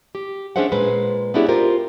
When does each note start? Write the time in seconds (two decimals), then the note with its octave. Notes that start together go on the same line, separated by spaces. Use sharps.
0.15 G4
0.56 C#4 D4 G#4 C5 E5 F#5
0.72 A#2 G#3 B4 C5
1.34 B3 C#4 D4 E4 G4 G#4
1.48 F4 G4 A#4 C5